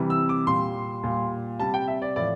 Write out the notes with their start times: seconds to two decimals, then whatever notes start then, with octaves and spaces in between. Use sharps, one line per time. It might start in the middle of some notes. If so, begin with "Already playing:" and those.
Already playing: C3 E3 G3
0.10 E6
0.29 D6
0.47 A#2 G3 C6
1.03 A#2 G3
1.59 C3 G3 A5
1.74 G5
1.88 E5
2.02 D5
2.16 A2 F3 D5